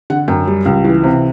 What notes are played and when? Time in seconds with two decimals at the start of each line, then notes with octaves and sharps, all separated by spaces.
0.10 D3 F#5
0.28 F#2 G5
0.47 G3
0.65 C#2
0.84 E3
1.04 C3